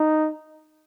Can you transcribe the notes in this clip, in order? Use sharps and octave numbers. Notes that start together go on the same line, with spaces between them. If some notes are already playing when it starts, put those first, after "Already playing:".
Already playing: D#4